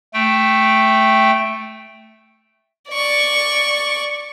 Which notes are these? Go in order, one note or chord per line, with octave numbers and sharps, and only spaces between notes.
A3 G5
D5 C#6